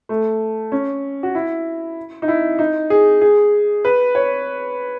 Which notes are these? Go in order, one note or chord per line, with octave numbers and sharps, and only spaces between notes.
A3
C#4
F#4
E4
D#4
E4
D#4
G#4
G#4
B4
C#5